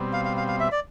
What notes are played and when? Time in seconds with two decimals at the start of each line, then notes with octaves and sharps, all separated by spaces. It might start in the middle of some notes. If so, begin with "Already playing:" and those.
Already playing: B2 G3 C4
0.13 F5
0.25 F5
0.37 F5
0.48 F5
0.60 E5
0.72 D5